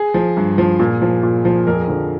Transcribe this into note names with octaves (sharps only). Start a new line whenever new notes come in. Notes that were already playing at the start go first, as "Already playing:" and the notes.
Already playing: G#4
F3
G2
F3
A#2
F3
A#2
F3
F2 A#4
G#4
A#4
D3 F3